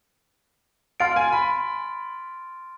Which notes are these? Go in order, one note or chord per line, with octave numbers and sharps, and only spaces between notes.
F5 C6 F6 A6 D7
G#5
B5